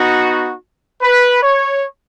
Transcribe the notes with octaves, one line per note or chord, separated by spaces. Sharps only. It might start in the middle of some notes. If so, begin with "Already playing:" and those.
Already playing: B3 D#4 F#4
B4
C#5